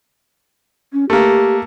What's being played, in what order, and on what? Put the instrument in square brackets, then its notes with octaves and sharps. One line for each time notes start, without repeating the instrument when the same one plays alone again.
[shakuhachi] C#4
[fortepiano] A3 A#3 [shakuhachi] G4